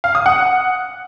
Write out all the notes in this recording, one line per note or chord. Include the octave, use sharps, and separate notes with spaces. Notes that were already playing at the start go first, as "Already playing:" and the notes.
F5
D#6
F#5